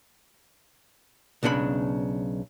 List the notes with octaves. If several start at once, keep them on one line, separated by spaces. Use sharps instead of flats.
B1 C#3 D4 A#4 B5